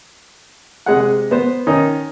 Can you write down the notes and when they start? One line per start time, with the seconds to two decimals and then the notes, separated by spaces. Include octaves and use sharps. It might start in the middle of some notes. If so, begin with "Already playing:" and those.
0.86 C3 G#3 G#4 F#5
1.31 B3 C5
1.67 D#3 C#4 D#4 D#5